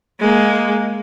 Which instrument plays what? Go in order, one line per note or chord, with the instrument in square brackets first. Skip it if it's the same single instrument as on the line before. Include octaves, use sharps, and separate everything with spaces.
[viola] G#3 A#3